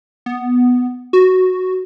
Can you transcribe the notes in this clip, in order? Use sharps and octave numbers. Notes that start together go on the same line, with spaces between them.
B3
F#4